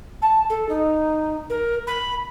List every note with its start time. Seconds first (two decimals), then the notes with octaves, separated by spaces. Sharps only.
0.22 A5
0.50 A4
0.69 D#4
1.50 A#4
1.87 B5